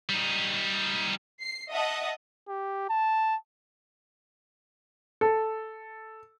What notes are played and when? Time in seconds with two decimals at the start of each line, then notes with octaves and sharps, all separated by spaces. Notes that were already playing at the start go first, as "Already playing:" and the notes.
0.09 G3 D#4
1.41 C7
1.70 D#5 E5 F#5 A5
2.49 G4
2.89 A5
5.21 A4